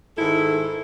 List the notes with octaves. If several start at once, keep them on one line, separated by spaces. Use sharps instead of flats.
G#2 D#3 E4 A4